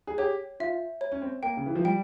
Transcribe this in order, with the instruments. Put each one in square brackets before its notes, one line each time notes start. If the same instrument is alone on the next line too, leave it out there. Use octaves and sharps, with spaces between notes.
[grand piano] G#4
[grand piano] G4 [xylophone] C#5
[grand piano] F4 [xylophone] E5
[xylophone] C#5
[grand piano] C#4
C4
[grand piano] A#3 [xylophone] G5
[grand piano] C#3
E3
F3
[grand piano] G3 [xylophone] G5